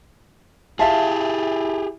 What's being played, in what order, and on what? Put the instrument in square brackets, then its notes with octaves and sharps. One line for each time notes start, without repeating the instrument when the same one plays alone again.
[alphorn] E4 [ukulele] F4 E5 F5 [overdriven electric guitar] G4 G#4 [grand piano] A5